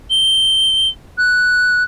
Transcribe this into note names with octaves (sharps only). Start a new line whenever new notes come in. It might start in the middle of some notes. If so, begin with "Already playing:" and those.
G7
F#6